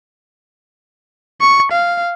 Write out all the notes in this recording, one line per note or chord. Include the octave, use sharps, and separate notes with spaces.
C#6
F5